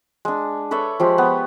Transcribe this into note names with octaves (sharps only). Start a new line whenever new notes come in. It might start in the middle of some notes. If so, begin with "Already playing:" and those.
G#3 D4
A4 B4 C#5 E5
F3 G#3 G4
B3